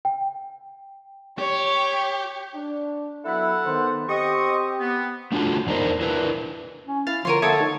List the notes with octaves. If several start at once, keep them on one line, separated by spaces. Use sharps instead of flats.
G5
G4 C#5
D4
F#3 B3 E4 A4 F#5 B5
D#3 B3 C5
C4 G4 D#5 C#6 D#6
B3
A3 D4 F4 F#4 A4
E2 D4 D#4 A#4 C5
D4 E4 A#4 B4
C#4
E4 F5 A6
D3 F3 A#4 C#5 C6 D#7
D3 A#3 A4 C#5 E5 D#6
A3 D#4